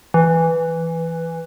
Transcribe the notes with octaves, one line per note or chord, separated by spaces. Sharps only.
E3